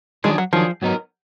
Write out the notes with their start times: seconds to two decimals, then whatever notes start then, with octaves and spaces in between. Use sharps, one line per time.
0.24 D#3 F#3 G#3 D4 G#4
0.38 F#3
0.53 D#3 F3 F#3 D4 G#4
0.82 G#2 F#3 B3 D#4 A#4